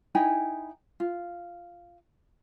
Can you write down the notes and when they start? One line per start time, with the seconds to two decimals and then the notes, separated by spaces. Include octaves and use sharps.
0.15 D#4 E4 G5 G#5
1.00 F4